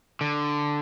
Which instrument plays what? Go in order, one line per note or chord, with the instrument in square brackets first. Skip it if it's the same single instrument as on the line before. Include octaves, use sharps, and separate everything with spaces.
[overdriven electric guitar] D3